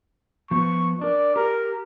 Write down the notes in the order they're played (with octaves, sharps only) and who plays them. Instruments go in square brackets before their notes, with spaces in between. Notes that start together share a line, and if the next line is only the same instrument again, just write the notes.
[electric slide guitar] F3 B3 [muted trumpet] C#6
[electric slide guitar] D4 A#4 [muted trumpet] D5
[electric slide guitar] G4 [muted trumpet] A#4